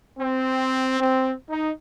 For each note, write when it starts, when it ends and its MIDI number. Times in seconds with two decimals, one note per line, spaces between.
0.19 0.97 60
1.00 1.32 60
1.50 1.71 63